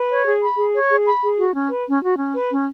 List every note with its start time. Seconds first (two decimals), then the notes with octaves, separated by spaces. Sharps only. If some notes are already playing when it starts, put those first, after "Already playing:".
Already playing: B4
0.09 C#5
0.25 G#4
0.42 B5
0.58 G#4
0.74 C#5
0.90 G#4
1.05 B5
1.22 G#4
1.38 F#4
1.54 C#4
1.70 B4
1.86 C#4
2.03 F#4
2.18 C#4
2.35 B4
2.50 C#4